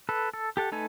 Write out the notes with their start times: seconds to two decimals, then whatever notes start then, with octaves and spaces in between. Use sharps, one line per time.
0.09 A4 B4
0.34 A4
0.57 G4 A4 F#5
0.72 A3 D#4 A4 B4 G#5